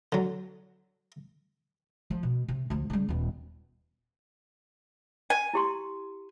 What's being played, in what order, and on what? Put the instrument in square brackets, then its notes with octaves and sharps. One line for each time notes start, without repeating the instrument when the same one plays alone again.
[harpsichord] D3 F#3
[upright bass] F3
B2
C3
D2 F3
C#3 G3
D#1 B3
[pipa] G#5
[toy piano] E4 G4 C6